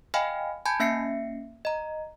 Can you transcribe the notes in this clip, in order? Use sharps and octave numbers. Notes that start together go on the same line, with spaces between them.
D#5 F5 G5 G#5 B5 F6
G#5 A5 B5 G6 G#6
A#3 C#4 E5 A#6 C7 C#7
D#5 A#5